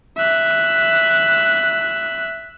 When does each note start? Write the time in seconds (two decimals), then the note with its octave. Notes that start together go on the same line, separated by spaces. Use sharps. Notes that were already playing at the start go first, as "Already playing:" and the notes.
0.18 E5 F#6